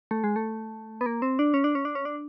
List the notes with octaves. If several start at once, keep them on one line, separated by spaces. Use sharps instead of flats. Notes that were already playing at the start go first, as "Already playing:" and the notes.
A3
G#3
A3
B3
A#3
C4
D4
C#4
D4
C#4
D4
C#4
D4